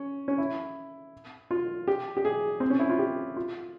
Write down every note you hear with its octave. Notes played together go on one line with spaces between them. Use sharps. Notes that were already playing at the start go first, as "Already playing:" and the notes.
Already playing: C#4
C#4
E4
F4
G4
G4
G#4
C4
C#4
E4
F4
G4
F4